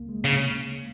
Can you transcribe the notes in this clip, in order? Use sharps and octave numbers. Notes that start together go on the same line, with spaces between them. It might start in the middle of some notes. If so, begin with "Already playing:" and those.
Already playing: C#2 A#3
G#3
C#2 C#3